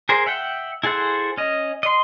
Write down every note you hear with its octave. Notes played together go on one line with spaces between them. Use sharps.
G#4 A#4 C5
E5 F#5 G5
E4 G#4 A4 C5 F#5
C#4 D#5
D#5 C6